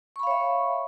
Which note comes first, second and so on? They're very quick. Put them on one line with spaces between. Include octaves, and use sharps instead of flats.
C#6 B5 F5 C#5 E5